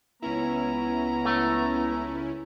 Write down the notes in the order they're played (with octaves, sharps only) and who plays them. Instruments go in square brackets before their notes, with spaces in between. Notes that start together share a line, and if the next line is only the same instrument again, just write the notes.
[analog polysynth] C#2 C#4 E4 [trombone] B3 [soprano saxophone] A#5
[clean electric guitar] A3